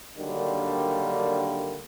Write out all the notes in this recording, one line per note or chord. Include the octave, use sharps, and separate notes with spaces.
D3 D#3 F#3 G3 A#3 D4